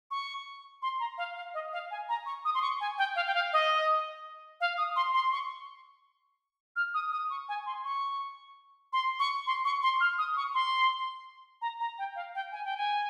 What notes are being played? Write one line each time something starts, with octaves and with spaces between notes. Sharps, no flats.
C#6
C6
A#5
F5
F5
D#5
F5
G#5
A#5
C#6
D#6
C6
C#6
G#5
G5
F5
G5
F5
D#5
F5
D#6
C6
C6
C#6
F6
D#6
D#6
C#6
G#5
C6
C#6
C6
C#6
C6
C#6
C6
F6
D#6
C#6
C6
A#5
A#5
G5
F5
G5
G#5
G5
G#5